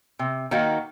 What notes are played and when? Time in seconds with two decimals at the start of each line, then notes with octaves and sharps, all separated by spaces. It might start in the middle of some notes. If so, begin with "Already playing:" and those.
0.19 C3
0.51 D#3 A#3 D#4 F#4